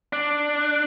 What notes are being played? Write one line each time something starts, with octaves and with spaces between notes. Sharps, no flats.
D4